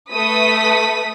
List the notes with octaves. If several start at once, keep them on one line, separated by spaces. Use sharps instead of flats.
A3 B4 D#6 B6